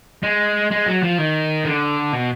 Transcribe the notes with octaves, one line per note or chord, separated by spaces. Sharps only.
G#3
G#3
F#3
F3
D#3
D3
B2